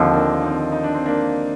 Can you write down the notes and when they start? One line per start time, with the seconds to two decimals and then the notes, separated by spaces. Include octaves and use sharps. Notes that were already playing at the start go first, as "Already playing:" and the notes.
Already playing: D#2 D3 F3 C4 D#4
0.13 A#3 D4
0.43 C4 D#4
0.72 D#4
0.83 D4
0.94 C4
1.06 A#3 D4